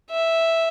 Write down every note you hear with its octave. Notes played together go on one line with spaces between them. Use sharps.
E5